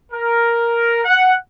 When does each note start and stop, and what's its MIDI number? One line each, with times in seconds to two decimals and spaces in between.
0.13 0.99 70
1.05 1.33 78